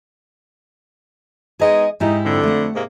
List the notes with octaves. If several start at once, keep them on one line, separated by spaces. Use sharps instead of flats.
G#3 B3 D#4 G#4 D#5
G#2 D#4 E4 G4
F2 D3
A3 F#5
G#2 C3 A#3